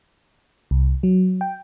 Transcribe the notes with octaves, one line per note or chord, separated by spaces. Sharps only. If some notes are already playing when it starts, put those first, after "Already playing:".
C2
F#3
G5